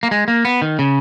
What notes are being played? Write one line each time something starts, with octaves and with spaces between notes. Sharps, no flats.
A#3
G#3
A#3
B3
D#3
C#3